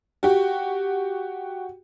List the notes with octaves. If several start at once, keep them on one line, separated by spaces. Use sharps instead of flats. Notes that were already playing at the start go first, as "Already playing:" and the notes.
F#4 G4